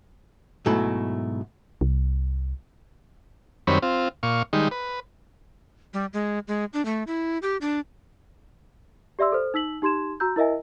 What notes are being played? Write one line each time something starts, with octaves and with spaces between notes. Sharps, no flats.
G#2 B2 F#3 A3 E4
C2
F#2 D#3 G3 C4 C#5 B5
C4 F4
A#2 F5 C#6
D#3 G3 G#3 D#4
B4
G3
G#3
G#3
D4
A3
E4
G4
D4
G4 D5 E5 C6 E6
A4 C5
D#4 E6 B6 F#7
D#4 G4 C6 G#6 E7
F#4 A#5 E6 G6
E4 A#4 D#5 E5 G#5